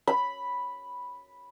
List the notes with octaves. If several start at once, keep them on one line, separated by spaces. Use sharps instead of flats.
B5